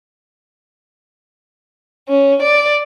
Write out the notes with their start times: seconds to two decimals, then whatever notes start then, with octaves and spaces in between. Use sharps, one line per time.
2.09 C#4
2.42 D5